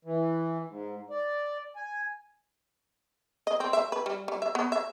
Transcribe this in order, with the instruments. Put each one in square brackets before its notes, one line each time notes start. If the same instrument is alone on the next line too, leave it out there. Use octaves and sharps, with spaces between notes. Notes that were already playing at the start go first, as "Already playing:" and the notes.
[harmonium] E3
G#2
D5
G#5
[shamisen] D#5
C4
E5
B4
G3
G3
E5
B3
E5